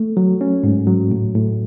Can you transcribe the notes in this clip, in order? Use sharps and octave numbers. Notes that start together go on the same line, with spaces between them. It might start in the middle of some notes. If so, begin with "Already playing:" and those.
Already playing: A3
F#3
C#4
G#2
F#3
A2
A2